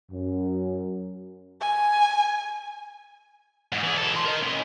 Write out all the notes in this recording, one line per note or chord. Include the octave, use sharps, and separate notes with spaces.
F#2
G#5
E2 G#2
E3 G#4
B2 A4
E3 C6
A#4 D#5
C#4 E4